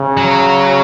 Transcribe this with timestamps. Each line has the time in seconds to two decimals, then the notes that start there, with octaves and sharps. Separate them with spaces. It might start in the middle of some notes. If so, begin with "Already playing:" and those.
Already playing: C#3
0.17 F#3